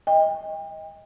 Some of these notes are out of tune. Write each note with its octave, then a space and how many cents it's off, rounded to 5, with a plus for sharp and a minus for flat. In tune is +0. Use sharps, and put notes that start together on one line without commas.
D#5 +20 G5 +35